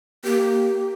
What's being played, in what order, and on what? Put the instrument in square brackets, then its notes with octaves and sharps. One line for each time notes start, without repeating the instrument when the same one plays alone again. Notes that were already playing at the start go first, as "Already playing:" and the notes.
[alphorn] A#3 [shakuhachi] G4